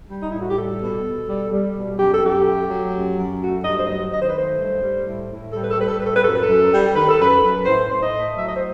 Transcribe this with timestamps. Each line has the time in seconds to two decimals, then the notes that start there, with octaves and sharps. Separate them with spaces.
0.09 G3
0.22 D#4
0.32 A2 E4
0.40 F#4
0.49 G4
0.56 G3 A4
0.81 B2
1.04 B2
1.28 G3
1.51 G3
1.76 B2
1.99 F#2 G4
2.12 A4
2.22 F#2 G4
2.46 A3
2.70 F#3
2.93 F#2
3.17 F#2
3.41 A3 F#4
3.64 G2 D#5
3.78 C5
3.87 F#3 D#5
4.11 D#3 D#5
4.21 C5
4.29 B4
4.35 A3 C5
4.59 G2
4.82 G3
5.06 A2
5.30 A2
5.53 G3 A4
5.62 B4
5.71 A4
5.77 G3 B4
5.88 A4
5.98 A2 B4
6.06 A4
6.15 B4
6.24 F#2 A4
6.33 B4
6.42 A4
6.47 F#2
6.72 G3
6.95 D#3 B4
7.08 A4
7.19 F#2 B4
7.42 F#2
7.65 A2 C5
7.89 A2 C5
8.02 D#5
8.14 A3
8.36 F#3 E5
8.46 D#5
8.55 C5